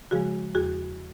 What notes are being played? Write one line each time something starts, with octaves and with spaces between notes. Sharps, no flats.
C#3 F3 G#3 F#4 G#4
E2 F#4 G#4